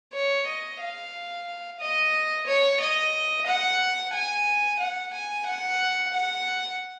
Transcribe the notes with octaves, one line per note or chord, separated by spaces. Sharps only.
C#5
D#5
F5
D#5
C#5
D#5
F#5
G#5
F#5
G#5
F#5
F#5